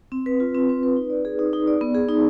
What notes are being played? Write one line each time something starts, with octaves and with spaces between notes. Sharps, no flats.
C4
B4
F4
C4
C4
B4
D#4
D5
G#4
D#4
D#4
D5
B3
G#4
D#4